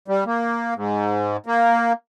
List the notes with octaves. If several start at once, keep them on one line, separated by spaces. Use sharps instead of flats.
G3
A#3
G#2
A#3